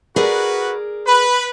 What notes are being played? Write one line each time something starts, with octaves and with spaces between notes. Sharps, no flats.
F#4 G#4 A#4 B4 D5
B4 B5